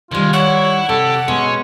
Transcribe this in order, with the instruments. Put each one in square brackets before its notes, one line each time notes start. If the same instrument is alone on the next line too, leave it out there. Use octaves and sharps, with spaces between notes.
[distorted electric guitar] C2 G#3 [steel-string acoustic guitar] D#3 G3 [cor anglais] F4
[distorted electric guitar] E4 [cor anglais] C#5 [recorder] F#5
[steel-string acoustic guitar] C3 [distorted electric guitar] G4 [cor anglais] A4
[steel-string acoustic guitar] B2 [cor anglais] G#3 [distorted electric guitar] C#4